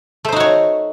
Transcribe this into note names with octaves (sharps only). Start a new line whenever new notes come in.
A3 D#4 F#4 C5 C#5